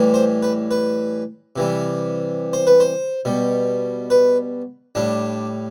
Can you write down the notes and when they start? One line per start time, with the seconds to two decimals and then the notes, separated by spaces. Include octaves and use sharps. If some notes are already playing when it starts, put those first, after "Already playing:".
Already playing: A2 E3 G3
0.14 C5
0.42 B4
0.71 B4
1.56 C3 E3 G3
2.53 C5
2.67 B4
2.80 C5
3.25 B2 G3
4.10 B4
4.95 A2 G3 D4